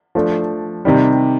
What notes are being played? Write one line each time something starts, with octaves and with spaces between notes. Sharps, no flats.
F3 A3 D4
C3 D#3 G3